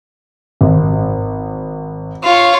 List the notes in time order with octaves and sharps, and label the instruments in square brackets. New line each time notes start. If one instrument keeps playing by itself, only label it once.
[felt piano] G#1
[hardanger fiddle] F4 C#5